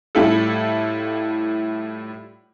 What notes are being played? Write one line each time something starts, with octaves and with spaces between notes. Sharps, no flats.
A2 G3 E4 F4 A4